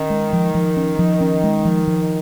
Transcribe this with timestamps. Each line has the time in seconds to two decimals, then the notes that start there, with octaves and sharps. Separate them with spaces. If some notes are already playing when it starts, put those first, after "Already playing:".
Already playing: D#3 C#4
0.10 G#3
0.33 F3
0.55 F3
0.77 C#4
0.99 F3
1.21 C#4
1.44 G#3
1.65 F3
1.87 F3